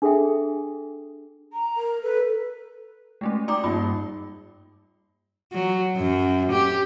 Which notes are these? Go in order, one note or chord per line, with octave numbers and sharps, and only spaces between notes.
D4 G#4 A4 E5 G5
A#5
A#4
A4 B4
G#3 A3 C#4
D#4 D5 G5 A#5 D6
G2 G3 A#3 F4
F#3
F#2
G4